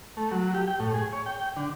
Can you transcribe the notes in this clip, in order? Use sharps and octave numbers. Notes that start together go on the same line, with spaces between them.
A3
F#3
G4
G5
A2
G#4
C#5
G5
D3